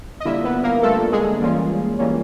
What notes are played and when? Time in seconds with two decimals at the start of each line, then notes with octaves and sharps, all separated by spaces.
0.20 D#5
0.25 D3 G3 A#3 D4 E4 F4 E5
0.44 B3 B4
0.63 A#3 A#4
0.83 D3 G3 A3 A#3 D4 F4 A4
1.12 G#3 G#4
1.41 E3 G3 A#3 C#4 F4
1.99 E3 G3 A#3 C#4 F4